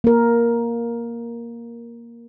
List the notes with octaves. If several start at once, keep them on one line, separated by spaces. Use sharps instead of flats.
A#3 A#4